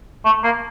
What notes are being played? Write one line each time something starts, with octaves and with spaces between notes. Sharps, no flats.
A3
A#3